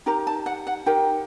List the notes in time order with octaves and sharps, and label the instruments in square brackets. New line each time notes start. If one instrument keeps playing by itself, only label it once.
[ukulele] D#4 G4 A#4 A#5
A5
F#5
F#5
D#4 G4 A#4 G5